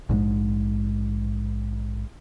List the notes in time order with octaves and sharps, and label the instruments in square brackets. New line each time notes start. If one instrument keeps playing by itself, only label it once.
[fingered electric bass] A#1 G#2 C#3 G#3